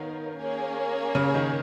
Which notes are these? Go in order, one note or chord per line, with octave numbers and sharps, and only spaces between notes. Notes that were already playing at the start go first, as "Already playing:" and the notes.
Already playing: D#3 B3 D#4 A#4 C#5 F5
A#3 C#4 G#4 C#5
C#3
D#3